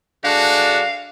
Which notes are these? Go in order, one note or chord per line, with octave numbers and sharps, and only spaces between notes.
D3 G#3 D4 F#4 F5